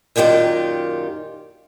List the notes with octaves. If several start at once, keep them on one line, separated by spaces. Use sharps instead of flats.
F#2 A#2 D#3 F4 G4